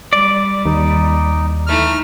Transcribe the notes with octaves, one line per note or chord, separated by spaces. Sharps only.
G3 D5
D#2 D#4
E3 A3 D#4 F6